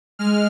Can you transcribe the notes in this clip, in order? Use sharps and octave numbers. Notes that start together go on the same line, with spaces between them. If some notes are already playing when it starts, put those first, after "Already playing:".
G#3 F6